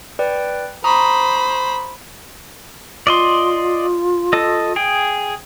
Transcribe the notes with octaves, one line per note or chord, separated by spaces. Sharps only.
B4 D5 G5
C5 A#5 B5 C#6 D#6
F4 D5 D#5 C6
A4 D#5
G#4 G5